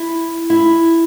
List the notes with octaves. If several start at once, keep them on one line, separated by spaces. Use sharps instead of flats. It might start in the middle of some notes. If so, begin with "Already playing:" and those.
Already playing: E4
E4